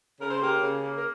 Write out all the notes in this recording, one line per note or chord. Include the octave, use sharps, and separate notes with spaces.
C#3 A#4
C5
A#3 G4 A#4
C#3
A#3
A#4